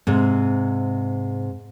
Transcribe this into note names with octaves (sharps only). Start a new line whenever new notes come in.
G#2 C3